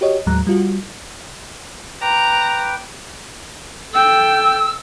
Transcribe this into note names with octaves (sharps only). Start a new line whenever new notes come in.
F#4 G4 C#5 D#5
D#2 A2 F#3 G#3 A#5 F#6
G3 F4 F#4
B4 G5 A#5 D6
A4 G5 E6